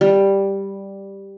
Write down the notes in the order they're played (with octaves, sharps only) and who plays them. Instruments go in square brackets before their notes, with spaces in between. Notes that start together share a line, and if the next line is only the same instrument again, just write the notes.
[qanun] G3